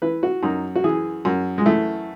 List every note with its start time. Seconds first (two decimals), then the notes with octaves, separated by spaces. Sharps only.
0.02 E3 B4
0.23 F#4
0.43 F#2 D#4
0.76 F#4
0.84 E3 G#4
1.25 F#2
1.58 G#3
1.66 E3 A3